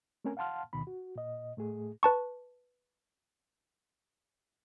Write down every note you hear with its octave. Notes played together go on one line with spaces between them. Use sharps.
A3 C4 C#4 A#4 G#5
F5 F#5 A5 C6 F6
D2 B2 D#3 B5
F#4
A#2 D#5
A2 A3 G#4
B4 A5 C#6